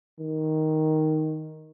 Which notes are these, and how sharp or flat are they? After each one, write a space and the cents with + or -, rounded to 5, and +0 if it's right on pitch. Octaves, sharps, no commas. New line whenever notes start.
D#3 +5